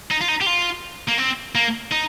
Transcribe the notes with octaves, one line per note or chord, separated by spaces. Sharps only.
D#4
F4
D#4
G4
F4
A#3
C4
A#3
D#4